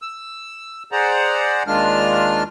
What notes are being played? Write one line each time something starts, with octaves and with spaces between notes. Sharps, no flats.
E6
G#4 C5 D5 F#5 A#5
D#2 D#3 G#3 D4 F4 F6